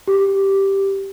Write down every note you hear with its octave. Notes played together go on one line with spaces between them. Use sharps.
G4